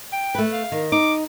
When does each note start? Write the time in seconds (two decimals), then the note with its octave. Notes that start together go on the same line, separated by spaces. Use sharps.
0.13 G5
0.35 A3 B4
0.52 F5
0.72 D#3
0.92 D#4 D6